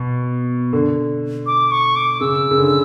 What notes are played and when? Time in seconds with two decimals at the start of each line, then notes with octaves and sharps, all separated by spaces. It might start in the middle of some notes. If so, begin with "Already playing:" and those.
Already playing: B2
0.73 D3
1.46 D6
1.71 C#6
1.96 D6
2.21 C#3 E6
2.51 C#3
2.58 D3